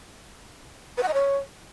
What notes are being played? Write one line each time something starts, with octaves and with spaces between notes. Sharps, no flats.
B4
F#5
D#5
C#5